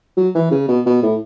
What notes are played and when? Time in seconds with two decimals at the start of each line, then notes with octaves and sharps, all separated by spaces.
0.17 F#3
0.35 E3
0.51 C#3
0.68 B2
0.86 B2
1.03 A2